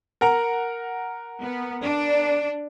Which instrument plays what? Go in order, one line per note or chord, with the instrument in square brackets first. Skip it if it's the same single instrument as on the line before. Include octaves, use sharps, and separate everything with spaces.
[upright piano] A#4 F#5 A#5
[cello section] B3
D4